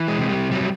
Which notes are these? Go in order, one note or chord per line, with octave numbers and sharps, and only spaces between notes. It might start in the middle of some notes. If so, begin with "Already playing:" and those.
Already playing: E3
G#3
C3
G3
F#3 G3